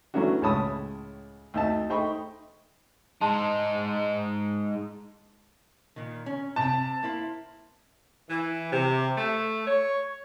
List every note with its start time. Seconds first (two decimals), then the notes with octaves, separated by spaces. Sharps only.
0.14 E3 F#3 A3 C#4 D4 F#4
0.42 C#2 A2 C#5 A5 B5 D#6
1.54 D2 D#4 E5 A5
1.90 A3 D#4 C5 G5 B5 C#6
3.21 G#3 D#4 A5 C6
5.96 A#2 D#3
6.26 C#4
6.56 C3 C4 A5
7.03 A#3 E4 C5
8.29 E3
8.73 C3
9.18 A3
9.67 C#5